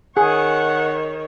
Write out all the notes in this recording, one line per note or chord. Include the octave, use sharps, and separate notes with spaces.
D#3 G#4 C#5 F#5